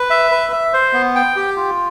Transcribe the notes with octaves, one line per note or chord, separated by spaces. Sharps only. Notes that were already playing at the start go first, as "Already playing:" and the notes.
Already playing: B4
E5
B4
E5
C5
B3
G5
G4
F4